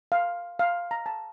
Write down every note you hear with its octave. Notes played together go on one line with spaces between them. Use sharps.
F5
F5
A#5
A5